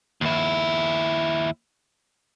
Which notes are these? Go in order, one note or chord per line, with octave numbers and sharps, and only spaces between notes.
D#2 E4